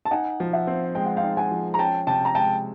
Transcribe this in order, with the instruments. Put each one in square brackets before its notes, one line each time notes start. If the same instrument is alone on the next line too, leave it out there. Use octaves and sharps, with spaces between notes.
[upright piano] A5
[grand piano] D#4 [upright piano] F#5 G#5
[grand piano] F3
[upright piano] E5 F#5
[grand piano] C4
[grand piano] G#3 [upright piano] G5
[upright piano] F#5
F5 G5
[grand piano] D#4
[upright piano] F#5 G#5
[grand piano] F3
[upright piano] A#5
[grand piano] C#4 [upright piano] G5 A5
[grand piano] C3 [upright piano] G5 A5
[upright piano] A#5
[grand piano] G#3 [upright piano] G5 A5